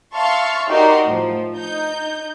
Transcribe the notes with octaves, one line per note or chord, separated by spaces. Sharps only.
E5 F5 A5 C6 C#6
D#4 F#4 G4 A#4 D5 C6
A2 F3
D#4 G6